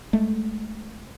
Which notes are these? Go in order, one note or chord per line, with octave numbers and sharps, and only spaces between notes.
G#3 A3